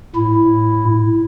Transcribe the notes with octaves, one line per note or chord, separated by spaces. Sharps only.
A2 E4